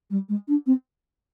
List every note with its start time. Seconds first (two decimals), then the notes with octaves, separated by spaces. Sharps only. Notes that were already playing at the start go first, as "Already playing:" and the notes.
0.10 G3
0.29 G#3
0.48 D4
0.66 C4